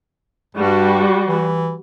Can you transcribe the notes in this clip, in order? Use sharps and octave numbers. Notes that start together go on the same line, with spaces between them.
G2 G3 F#4
E3